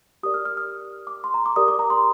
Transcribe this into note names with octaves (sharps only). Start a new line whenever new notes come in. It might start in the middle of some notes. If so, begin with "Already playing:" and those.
G4 A#4 D5 D#6
F6
F6
F6
D6
C6
A#5
D6
G4 A#4 D5 D#6
D6
A#5
C6